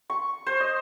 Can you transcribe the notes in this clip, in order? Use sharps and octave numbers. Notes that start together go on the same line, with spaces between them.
C#6
C5
D#5